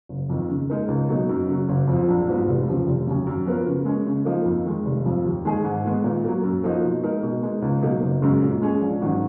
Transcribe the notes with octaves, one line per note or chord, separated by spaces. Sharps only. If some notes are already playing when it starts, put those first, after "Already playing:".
F#1
F2 D#3
C#3
G#3 D#4 A#4
C#2
B2 F#3 A#3 D#4
F#2
C#3 F#3
F#1
F2
F3
A#1
G#2 F3 B3 F#4
F1
D#2 C#3 F3
F1
D#2 C#3 F#3 C#4
F#2
F3 B3 F#4 A#4
C#3
G#3 C#4
C#3
F3 A#3 D#4
F2
D#3 G#3
F1
F2 F3
D#2
D#3 G#3 D#4 G#4
G#2
D#3 G#3 B3
A#2
F#3 A#3
F#2
F3 A#3 D#4 F#4
B2
G#3 D#4 A#4
B2
G#3 D#4
C#2
B2 F#3 A#3 D#4
F#1
F#2 C#3 G#3
A#2
G#3 C#4 G#4
A#1
G#2 D#3 F#3 C#4